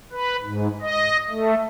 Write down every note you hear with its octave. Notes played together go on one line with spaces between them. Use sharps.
B4
G#2
D#5
A3